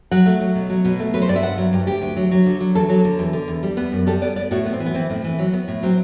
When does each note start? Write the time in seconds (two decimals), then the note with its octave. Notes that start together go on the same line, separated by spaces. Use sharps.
0.11 F#3 F#5
0.26 A3
0.41 F#3
0.55 B2
0.70 F#3
0.85 B2
0.99 A3
1.14 F#3 B4
1.22 C5
1.29 G2 D5
1.36 E5
1.43 G2 F#5
1.57 F#3
1.73 G2
1.87 D2 G4
2.02 D2
2.17 F#3
2.31 F#3
2.46 D3
2.61 F#3
2.75 E2 A4
2.89 F#3
3.05 D3
3.19 E2
3.33 D3
3.48 E2
3.63 G3
3.77 B3
3.92 F#2
4.07 G3 A4
4.22 B3 D5
4.36 B3 D5
4.51 A2 F#4
4.66 B3
4.73 C4
4.80 E3
4.86 B3
4.94 E3 C4
5.10 A2
5.24 E3
5.39 F#3
5.53 B3
5.68 A2
5.83 F#3 C4